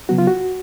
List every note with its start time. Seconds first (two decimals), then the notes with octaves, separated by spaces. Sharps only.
0.09 C#3 F#3 B3 F#4
0.18 F4
0.27 F#4